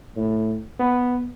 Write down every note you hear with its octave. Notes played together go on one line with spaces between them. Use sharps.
A2
B3